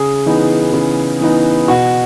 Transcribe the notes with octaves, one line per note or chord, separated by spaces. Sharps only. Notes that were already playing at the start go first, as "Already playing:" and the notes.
Already playing: C#3 G#4
E3 B3 D#4
C#3
E3 B3 D#4
B2 F#4